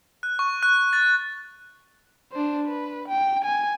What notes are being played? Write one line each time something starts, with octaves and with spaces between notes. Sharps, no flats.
F#6
C#6
F#6
A6
D4 C5
B4
G5
G#5